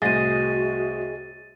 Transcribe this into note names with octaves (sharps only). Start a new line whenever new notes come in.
C2 A2 F#4 G#4 C5 D#5 A6 D#7